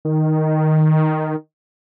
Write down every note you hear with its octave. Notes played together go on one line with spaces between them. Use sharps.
D#3